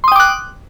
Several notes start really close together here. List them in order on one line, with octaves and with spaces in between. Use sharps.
C6 D#6 G5 D6 F#6